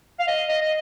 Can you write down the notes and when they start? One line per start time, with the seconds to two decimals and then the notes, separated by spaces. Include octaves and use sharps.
0.19 F5
0.28 D#5
0.49 D#5
0.61 D#5